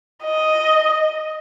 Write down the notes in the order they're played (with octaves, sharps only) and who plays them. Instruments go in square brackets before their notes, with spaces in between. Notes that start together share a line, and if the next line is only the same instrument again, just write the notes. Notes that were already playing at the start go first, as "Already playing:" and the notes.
[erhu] D#5